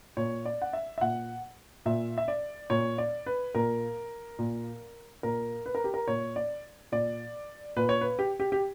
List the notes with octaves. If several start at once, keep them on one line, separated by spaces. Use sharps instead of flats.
A#2 C#5
D5
F#5
E5
E5
A#2 F#5
A#2 E5
E5
D5
A#2 C#5
D5
B4
A#2 A#4
A#2
A#2 A#4
B4
A#4
G4
A#4
A#2 C#5
D5
A#2 D5
A#2 B4
C#5
B4
G4
G4
G4